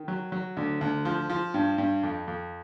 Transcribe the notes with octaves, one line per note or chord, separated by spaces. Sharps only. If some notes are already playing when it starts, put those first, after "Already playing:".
Already playing: D#3
F#3
F#3
D2
D2
F3
F3
G2
G2
F2
F2